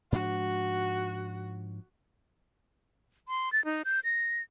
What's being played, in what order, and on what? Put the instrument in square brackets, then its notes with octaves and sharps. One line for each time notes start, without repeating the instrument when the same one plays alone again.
[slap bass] G#2 F3 D4 [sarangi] F#4
[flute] C6
A6
D#4
G6
A#6